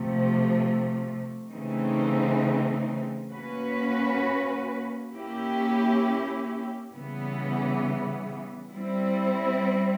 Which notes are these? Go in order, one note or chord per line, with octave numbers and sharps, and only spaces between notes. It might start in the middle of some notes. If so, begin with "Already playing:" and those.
Already playing: C3 F3 A3
C#3 E3 A3 C4 D#4
A#3 C#4 F#4 B4
A#3 C#4 E4 G4
C#3 E3 G3 B3
G3 C4 E4